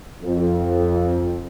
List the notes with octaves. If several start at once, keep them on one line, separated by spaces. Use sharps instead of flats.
F2